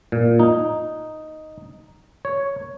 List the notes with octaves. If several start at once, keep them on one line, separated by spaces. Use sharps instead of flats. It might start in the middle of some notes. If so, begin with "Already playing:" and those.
A#2
D#4
C#5